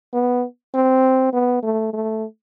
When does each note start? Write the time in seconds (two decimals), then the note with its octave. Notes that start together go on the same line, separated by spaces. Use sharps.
0.14 B3
0.74 C4
1.34 B3
1.63 A3
1.93 A3